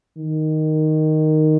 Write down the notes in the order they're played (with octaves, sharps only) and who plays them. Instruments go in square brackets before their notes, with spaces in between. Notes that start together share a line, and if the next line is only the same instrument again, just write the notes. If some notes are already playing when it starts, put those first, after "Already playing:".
[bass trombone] D#3